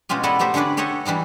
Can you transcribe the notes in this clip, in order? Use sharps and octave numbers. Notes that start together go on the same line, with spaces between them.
B2 G#3 C#4 F4 G4
B3 E4 A4 B4 D5 D#5
A3 D#4 G4 C5
D3 C#4 D4 B4 D5
G4 A4 C#5 D#5 F#5
E3 G3 D4 D#4